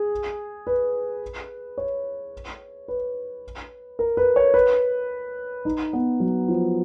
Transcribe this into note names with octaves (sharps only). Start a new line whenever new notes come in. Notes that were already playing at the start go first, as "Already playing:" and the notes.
Already playing: G#4
B4
C#5
B4
A#4
B4
C#5
B4
D#4
B3
F#3
F3